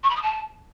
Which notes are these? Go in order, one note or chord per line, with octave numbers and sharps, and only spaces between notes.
C#6
B5
D#6
A5